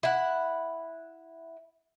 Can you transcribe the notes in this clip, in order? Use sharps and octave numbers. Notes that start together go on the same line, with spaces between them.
E4 F#5